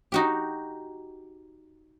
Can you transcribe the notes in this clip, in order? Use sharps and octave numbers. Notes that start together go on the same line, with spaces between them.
D#4 F#4 G4